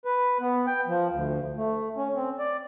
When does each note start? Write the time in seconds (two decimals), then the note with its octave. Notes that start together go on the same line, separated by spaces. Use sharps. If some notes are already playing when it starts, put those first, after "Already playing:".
0.05 B4
0.40 B3
0.67 G5
0.87 F3
1.12 D2
1.57 A3
1.96 C#4
2.16 C4
2.39 D5